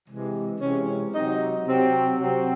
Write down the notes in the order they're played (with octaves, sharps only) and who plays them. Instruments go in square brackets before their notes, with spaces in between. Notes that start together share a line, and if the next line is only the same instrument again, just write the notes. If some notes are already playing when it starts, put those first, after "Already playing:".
[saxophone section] C3 E3 G#3
C3 E3 G#3 C#4
C3 F#3 C4 D#4
C3 F#3 C4
C3 F#3 C4